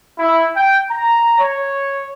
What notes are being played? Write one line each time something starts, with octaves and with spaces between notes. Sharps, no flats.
E4
G5
A#5
C#5